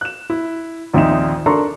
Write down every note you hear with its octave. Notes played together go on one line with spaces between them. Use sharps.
F#6 E7
E4
A#1 D#2 C4 D#4 E5 E7
D4 A4 A#4 A#5 C6 C#6